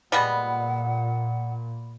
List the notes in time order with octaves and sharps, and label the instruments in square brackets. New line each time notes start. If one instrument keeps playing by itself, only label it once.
[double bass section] A#2 [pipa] G3 G#3 B3 [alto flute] F#5